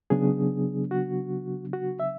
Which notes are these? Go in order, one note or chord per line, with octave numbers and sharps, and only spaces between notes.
C#3 F#3 B3 D4 G#4
F#4
F#4
E5